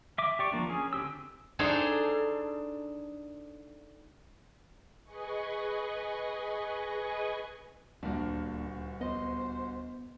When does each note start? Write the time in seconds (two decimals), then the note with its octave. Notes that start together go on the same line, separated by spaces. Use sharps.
0.18 E5 D6
0.39 G4 D5 C#6
0.52 F3 A#3 D4
0.69 C#4 G#4
0.93 D3 C4 G4 E6
1.59 D4 D#4 G#4 A4 C5 D5
5.04 G#4 B4 D#5 G#5 C#6
8.03 D#1 D2 A#3 D4
9.01 B3 C5 D#5